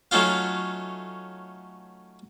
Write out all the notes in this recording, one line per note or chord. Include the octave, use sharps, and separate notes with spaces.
F#3 A3 C#4 D#4 F4 F5